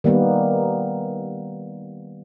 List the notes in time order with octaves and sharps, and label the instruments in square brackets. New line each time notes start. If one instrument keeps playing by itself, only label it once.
[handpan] D#3 G3 A#3 B3